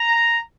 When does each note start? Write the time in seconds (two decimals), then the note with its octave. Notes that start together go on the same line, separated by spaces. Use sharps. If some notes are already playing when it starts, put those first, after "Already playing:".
Already playing: A#5